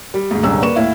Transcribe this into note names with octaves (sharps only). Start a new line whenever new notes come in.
G3
D2 G#2
D#1 C2 G#2 D3 C#4 E6
A#3 B4 D5 C#6 E7
D#2 A2 E4 F5